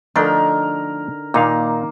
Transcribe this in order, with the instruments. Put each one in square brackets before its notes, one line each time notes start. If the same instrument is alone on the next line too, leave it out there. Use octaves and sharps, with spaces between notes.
[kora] D3 D#4 [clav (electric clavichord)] F3 A3 D4 [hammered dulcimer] A#4
[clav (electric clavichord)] A#2 D#4 F5 [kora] D#3 [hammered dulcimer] A#3